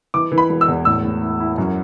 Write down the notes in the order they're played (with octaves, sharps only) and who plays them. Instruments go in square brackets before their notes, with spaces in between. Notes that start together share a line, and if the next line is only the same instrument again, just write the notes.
[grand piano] E3 [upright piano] D6
[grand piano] E3
[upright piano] B5
[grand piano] E1
[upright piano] E6
[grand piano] E2
[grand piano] A2 [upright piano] E6
[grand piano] A2
E4
E4
F#2